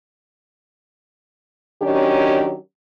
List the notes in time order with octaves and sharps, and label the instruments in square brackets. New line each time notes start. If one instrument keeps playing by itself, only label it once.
[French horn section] D#3 F#3 C#4 D4 G4